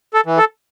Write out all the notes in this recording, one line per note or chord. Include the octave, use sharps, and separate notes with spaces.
A4
E3
A4